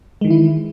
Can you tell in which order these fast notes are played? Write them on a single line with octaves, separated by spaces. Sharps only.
G#3 D#3 E3 E4